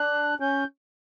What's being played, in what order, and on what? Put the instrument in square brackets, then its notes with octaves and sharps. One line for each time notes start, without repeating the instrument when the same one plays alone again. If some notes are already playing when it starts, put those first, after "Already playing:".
Already playing: [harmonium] D4 [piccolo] F#6
[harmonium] C#4 [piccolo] G6